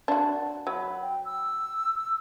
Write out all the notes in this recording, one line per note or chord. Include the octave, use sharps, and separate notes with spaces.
D4 F#4
F#3 B5
G5
E6